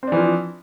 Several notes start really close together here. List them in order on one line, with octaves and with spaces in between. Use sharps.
C4 D4 E3 F3